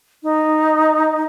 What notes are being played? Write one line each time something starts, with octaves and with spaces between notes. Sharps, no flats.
D#4